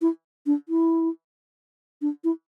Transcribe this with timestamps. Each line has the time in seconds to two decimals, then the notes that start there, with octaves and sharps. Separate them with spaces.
0.02 E4
0.46 D4
0.69 E4
2.02 D4
2.24 E4